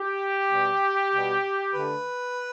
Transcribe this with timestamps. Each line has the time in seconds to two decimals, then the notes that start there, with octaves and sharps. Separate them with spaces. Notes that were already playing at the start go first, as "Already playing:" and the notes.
Already playing: G4
0.48 B2 G3 B3
1.11 B2 G3 B3
1.73 D3 A3 B4